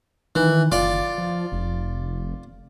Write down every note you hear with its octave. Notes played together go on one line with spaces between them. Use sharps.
D#3 E3
F#1 F4 D5
F3
F1